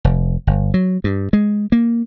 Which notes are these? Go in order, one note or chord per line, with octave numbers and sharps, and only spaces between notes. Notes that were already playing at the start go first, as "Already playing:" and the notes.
F1
G1
F#3
G2
G#3
A#3